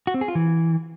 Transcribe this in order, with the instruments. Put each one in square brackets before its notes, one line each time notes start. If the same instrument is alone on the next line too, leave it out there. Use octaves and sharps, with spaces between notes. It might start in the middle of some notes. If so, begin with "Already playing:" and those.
[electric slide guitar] F#4
C4
G#4
F4
E3